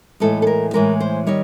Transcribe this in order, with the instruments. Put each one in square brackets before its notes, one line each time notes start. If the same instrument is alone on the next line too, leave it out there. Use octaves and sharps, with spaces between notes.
[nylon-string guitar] A2 E3 G#3 A4
A4
A#4
A2 E3 G#3 A#4
C5
D#3 G3 C#5